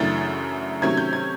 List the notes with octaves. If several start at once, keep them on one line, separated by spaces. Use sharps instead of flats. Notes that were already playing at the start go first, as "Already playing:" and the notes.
Already playing: F#2 C#3 E3 A3 D4 A6
C3 D#3 F#3 A3 C#4 G#6
G6
G#6